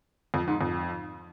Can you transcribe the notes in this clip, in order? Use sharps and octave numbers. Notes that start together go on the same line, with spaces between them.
F2
G#2
F2